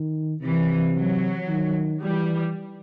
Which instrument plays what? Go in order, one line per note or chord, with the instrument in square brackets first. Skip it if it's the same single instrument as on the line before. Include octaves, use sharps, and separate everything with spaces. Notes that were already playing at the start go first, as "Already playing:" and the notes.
Already playing: [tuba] D#3
[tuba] C3 [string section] E3
[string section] F#3
[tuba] D#3
[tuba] E3 [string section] G3